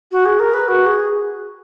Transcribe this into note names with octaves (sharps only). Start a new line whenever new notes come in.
F#4
G#4
A#4
B4
F#4
G#4